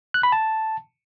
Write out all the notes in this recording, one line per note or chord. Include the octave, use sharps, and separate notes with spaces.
F#6
B5
A5